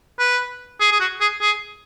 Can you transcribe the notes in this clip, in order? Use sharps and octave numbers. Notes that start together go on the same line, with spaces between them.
B4
G#4
G#4
F#4
G#4
G#4